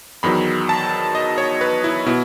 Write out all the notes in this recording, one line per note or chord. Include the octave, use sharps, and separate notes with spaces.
E2 D#3 F#3 B5
A5
D#5
C#5
B4
E4
B2 E4